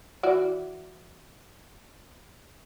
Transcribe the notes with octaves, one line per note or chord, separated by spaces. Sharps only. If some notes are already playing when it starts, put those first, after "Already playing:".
E3 F#4 D5